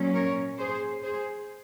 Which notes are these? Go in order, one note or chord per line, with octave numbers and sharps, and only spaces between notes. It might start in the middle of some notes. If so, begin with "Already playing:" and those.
Already playing: A#2 F#3 C#4
A#4 C#5
G#4 C5
G#4 C5